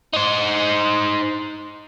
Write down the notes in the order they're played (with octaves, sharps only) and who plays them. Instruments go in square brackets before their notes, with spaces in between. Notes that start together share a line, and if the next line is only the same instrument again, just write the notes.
[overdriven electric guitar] D#4 C5